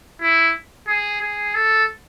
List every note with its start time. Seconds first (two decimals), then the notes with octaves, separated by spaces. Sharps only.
0.22 E4
0.88 G#4
1.21 G#4
1.55 A4